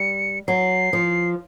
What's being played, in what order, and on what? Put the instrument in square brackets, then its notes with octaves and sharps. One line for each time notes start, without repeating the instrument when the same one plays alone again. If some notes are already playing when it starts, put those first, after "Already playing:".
Already playing: [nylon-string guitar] G3 [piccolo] C#7
[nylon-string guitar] F#3 [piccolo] C7
[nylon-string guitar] F3